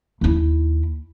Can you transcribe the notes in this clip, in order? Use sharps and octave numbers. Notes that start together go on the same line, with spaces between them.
D#2 E4